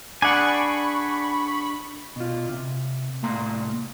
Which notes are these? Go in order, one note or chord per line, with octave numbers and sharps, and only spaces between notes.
D4 G#4 D5 F#5 G#5 B5 C#6
B2 F4
C3
C2 A2 A#3 A#5 C6